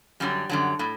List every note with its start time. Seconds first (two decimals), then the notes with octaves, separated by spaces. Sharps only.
0.20 F#2 D3 F#3 G3
0.49 F#2 D3 F#3
0.79 A2 F#3